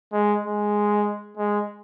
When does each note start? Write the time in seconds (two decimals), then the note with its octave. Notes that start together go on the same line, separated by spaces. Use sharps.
0.13 G#3
0.44 G#3
1.37 G#3